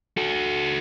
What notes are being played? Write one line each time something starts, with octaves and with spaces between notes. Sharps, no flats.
F#4 A4